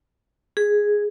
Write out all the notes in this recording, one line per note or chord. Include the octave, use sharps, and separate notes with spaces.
G#4